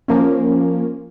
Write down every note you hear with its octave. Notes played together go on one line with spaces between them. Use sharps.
F3 A#3 C#4